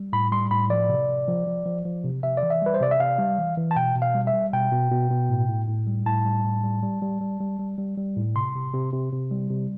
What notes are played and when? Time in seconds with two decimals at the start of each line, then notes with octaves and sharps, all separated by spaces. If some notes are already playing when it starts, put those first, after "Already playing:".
Already playing: G3
0.13 A2 B5
0.32 G3 C6
0.51 A2 B5
0.70 F3 D5
0.89 C3
1.09 C3
1.28 F3
1.47 F3
1.66 F3
1.85 F3
2.04 C3
2.23 C3 E5
2.37 D5
2.43 E3
2.50 E5
2.62 G3 B4
2.74 C5
2.81 C3 D5
2.91 E5
3.00 C3 F5
3.19 G3
3.38 E3
3.57 E3
3.71 A5
3.76 B2 G5
3.95 B2
4.02 F5
4.15 G3
4.27 E5
4.33 G3
4.53 B2 G5
4.72 B2
4.91 B2
5.10 B2
5.30 A2
5.49 A2
5.68 A2
5.87 G3
6.06 A2 A5
6.25 G3
6.44 A2
6.63 G3
6.83 G3
7.02 G3
7.21 G3
7.40 G3
7.59 G3
7.78 G3
7.98 G3
8.16 A2
8.35 C3 C6
8.55 C3
8.74 C3
8.93 C3
9.12 C3
9.31 G3
9.50 C3